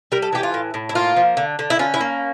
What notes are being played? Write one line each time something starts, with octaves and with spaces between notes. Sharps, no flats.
G3 A#4
A4
E3 G4
F4
A2
A2
E4
A#3 F4
F3
D3
D3
E4
C#4 F4
E4
A#3